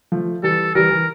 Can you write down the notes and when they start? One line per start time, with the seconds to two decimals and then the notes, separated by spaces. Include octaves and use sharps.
0.12 F3 A3
0.43 E3 G3 A4
0.75 E3 G3 A#4
0.91 E3